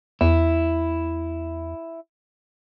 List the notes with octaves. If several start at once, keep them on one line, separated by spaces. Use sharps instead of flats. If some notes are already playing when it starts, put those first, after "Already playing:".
E2 E4